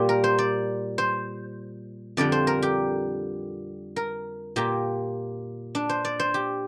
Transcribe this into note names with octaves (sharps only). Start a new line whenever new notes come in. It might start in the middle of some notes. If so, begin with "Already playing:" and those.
Already playing: A#2 G3 A#3 G4
A#4
C5
D5
C5
F2 D3 G3 D5
C5
A#4
G4
A#4
A#2 A#3 G4
D4
C5
D5
C5
G4